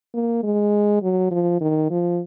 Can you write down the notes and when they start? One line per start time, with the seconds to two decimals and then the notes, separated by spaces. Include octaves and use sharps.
0.14 A#3
0.43 G#3
1.02 F#3
1.31 F3
1.61 D#3
1.90 F3